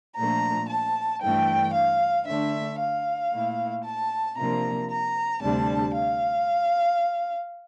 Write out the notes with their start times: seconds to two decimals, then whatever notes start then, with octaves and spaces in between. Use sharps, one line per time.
0.16 A#2 F3 A3 D4 A#5
0.69 A5
1.22 G2 E3 A3 D4 G5
1.74 F5
2.27 D3 A3 D4 E5
2.79 F5
3.32 A#2 A3 E4
3.85 A5
4.37 C3 F3 A#3 D4 A#5
4.90 A#5
5.42 D2 C3 G3 D4 A5
5.94 F5